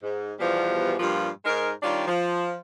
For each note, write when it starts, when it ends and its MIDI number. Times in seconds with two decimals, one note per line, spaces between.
0.03 0.33 44
0.39 0.94 40
0.39 0.94 47
0.39 0.94 52
0.39 0.94 53
0.39 0.94 55
0.99 1.29 43
0.99 1.29 46
0.99 1.29 53
0.99 1.29 55
0.99 1.29 65
1.45 1.71 44
1.45 1.71 56
1.45 1.71 63
1.45 1.71 70
1.82 2.06 51
1.82 2.06 55
1.82 2.06 62
1.82 2.06 65
1.82 2.06 73
1.82 2.06 74
2.07 2.55 53